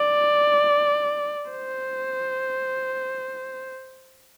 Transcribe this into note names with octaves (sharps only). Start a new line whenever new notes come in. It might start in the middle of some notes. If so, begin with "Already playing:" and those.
Already playing: D5
C5